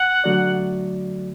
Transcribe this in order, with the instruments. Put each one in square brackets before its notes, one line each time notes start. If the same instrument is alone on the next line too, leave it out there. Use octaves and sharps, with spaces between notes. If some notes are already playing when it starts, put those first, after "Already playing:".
Already playing: [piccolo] F#5
[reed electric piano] D3 F#3 A3 F#4 D5